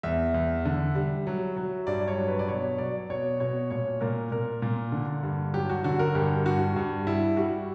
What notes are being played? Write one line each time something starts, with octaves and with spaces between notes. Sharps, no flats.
E2 E5
E2
D3
G3
F#3
F#3
G2 D5
C#5
F#3
B4
D5
B2 C#5
F#3 D5
B2 C#5
B2 C#5
A#2 C#5
A#2 A#4
A#2 A#4
A#2
D3
G2
F#3 G4
F#4
D3 F#4
A#4
G2 G4
G2 F#4
G2
G3 E4
G3 F#4